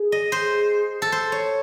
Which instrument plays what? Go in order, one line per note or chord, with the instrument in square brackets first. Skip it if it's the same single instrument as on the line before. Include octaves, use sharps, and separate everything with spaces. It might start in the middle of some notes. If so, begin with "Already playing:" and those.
Already playing: [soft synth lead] G#4
[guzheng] D#5
C5
A4
C5
C#5